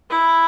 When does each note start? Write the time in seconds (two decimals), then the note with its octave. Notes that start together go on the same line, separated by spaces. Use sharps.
0.10 E4